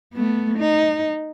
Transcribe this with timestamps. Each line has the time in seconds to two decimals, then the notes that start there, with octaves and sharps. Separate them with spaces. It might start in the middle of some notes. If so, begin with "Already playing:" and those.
0.14 A3 B3
0.58 D#4